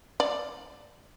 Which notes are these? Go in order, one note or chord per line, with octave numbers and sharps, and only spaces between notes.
D5